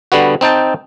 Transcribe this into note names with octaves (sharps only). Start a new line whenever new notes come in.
D3 G3 B3 F#4
C4 D#4 G5 A5